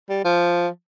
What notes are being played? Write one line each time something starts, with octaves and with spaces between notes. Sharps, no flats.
G3
F3